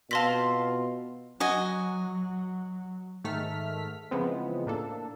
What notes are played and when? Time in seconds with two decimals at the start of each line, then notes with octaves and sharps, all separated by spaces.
0.11 B2 C4 F4 A5 C6 B6
1.40 F#3 F#4 D#5 G#5
3.24 G#2 D#3 A3 A4 F6 B6
4.11 C#3 E3 F3 G#3 B3 C4
4.66 A2 A#3 D4 A4